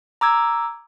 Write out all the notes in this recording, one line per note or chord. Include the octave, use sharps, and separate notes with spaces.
A#5 D6 E6 G#6